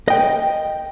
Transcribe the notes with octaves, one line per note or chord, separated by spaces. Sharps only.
D#5 G5